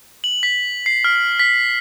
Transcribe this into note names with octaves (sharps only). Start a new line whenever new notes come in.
F#7
B6
C7
F6
B6